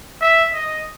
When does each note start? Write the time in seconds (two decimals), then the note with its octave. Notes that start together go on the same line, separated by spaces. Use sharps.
0.21 E5
0.54 D#5